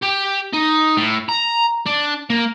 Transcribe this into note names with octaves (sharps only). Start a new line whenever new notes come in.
G4
D#4
A2
A#5
D4
A#3